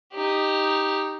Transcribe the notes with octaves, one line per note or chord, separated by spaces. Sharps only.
D#4 G4